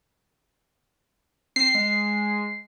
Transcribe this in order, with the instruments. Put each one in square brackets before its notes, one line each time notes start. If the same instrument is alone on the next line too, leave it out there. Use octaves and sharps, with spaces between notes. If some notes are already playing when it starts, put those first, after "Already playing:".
[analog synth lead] C4 [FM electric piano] C7
[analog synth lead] G#3